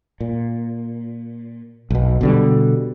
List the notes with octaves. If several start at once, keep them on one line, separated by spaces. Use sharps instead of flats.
A#2
B1 B2
B2 D3 G3